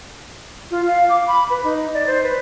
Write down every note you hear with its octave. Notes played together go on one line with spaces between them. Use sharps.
F4
F5
D6
B5
B4
D#4
D5
C5
B4